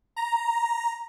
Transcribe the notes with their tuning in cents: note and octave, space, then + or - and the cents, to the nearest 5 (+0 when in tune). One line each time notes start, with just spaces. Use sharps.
A#5 +5